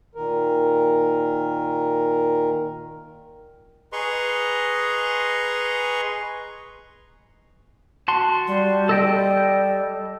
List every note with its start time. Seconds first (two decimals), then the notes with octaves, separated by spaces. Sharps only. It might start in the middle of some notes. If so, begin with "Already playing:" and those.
0.15 A#2 D#3 A#4
3.93 G#4 B4 D#5 A#5 C6 C#6
8.08 F#4 A5 C6
8.47 G3
8.89 A4 D#5 G5